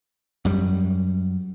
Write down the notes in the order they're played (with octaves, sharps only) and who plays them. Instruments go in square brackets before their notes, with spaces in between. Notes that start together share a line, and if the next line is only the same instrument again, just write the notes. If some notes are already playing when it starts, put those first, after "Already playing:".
[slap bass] F#2 G3